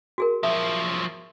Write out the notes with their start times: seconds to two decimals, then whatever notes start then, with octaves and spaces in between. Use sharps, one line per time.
0.18 F#4 G#4 A#4
0.43 F3 F#3 E5